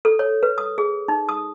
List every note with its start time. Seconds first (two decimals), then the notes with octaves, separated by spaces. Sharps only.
0.05 A4
0.19 C#5
0.43 B4
0.58 D#6
0.78 G#4
1.08 D#4
1.29 D#6